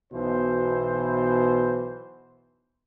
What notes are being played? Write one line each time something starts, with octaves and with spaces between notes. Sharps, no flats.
B1 B2 E3 C5